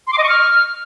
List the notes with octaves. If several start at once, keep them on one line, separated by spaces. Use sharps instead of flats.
C6
D6
D#5
C#6
F6